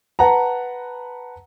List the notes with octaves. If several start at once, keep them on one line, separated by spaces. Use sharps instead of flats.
B4 F#5 A5 A#5